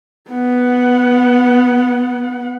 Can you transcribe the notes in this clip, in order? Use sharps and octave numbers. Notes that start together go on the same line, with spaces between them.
B3 F#5